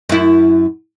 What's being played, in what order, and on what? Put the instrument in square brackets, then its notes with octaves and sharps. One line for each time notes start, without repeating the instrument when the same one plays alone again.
[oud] F#2 E4